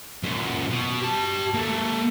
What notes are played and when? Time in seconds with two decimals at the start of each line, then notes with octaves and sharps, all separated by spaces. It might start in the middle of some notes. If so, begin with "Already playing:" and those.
0.23 F#2 A#2
0.70 B2
1.01 G4 A5
1.54 A#3 A4